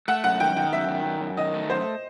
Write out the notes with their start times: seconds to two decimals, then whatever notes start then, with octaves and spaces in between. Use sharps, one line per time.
0.08 A3 F#5
0.24 F#2 F#5
0.40 D#3 G5
0.56 D#3 G5
0.73 F#2 E5
0.89 D#3
1.05 F#2
1.21 F#2
1.37 D#3 D#5
1.54 A3
1.70 F#2 C5